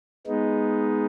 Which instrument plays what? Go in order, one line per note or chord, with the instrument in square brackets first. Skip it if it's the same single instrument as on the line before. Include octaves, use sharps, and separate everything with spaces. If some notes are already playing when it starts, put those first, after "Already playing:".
[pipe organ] G#3 B3 D#4